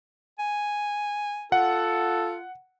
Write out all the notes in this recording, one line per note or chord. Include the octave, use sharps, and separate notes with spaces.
G#5
F4 A4 F#5